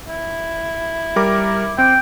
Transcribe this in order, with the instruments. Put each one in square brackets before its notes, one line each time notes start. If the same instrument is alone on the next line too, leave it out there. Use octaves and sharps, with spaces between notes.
[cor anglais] E4
[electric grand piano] G3 A#4 D6
[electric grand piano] C4 [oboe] G5